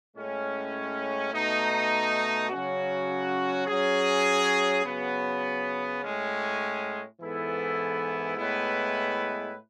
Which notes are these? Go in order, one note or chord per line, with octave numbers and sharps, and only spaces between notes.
A2 G#3 C#4
B2 A3 D#4
C#3 F#3 C#4 F#4
F#3 C#4 G#4
C#3 F#3 B3
A2 G#3 C#4
G#2 E3 B3 E4 A4
A2 G#3 B3 E4 B4